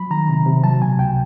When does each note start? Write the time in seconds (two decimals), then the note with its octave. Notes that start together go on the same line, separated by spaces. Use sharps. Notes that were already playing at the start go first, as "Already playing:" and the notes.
Already playing: F#3 B5
0.11 D#3 A#5
0.29 C3
0.46 C3
0.64 F#3 A5
0.82 B2 G#5
0.99 C#2 G5